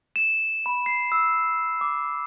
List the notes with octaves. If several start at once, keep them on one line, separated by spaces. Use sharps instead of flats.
E7
B5
C7
E6
D6